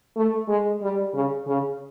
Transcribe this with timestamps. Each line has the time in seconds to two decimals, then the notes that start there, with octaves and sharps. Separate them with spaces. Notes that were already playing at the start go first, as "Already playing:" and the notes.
0.16 A3
0.49 G#3
0.82 G3
1.14 C#3
1.47 C#3